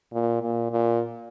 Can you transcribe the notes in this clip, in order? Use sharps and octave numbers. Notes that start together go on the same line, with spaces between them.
A#2
A#2
A#2